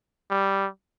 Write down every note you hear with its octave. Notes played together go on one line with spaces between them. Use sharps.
G3